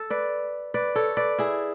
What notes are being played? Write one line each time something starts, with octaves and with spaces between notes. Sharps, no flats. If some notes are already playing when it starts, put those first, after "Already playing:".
Already playing: A4
B4 D5
B4 D5
A4 C#5
B4 D5
E4 G#4